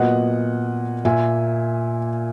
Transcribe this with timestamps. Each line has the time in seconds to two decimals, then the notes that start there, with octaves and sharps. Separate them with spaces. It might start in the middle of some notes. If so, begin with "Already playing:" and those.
Already playing: A#2 F#3 B3 D#5 F#5
1.05 A#2 A#3 E5 G#5